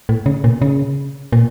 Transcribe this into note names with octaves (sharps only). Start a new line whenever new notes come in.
A2
C#3
A#2
C#3
A#2